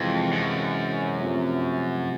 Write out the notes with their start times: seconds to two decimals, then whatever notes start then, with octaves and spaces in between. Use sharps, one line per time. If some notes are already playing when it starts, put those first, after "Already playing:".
Already playing: F2 C3 E3 G#3 C4
0.32 F#2
1.21 C3 F3 A3